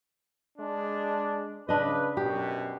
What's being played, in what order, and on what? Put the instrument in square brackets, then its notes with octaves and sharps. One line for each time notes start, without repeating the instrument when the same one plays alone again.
[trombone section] G#3 D4
[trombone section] C#3 B4 [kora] D4 D#5
[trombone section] F#2 B2 [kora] G4